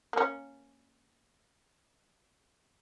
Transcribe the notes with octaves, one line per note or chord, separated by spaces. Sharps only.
A#3 C#4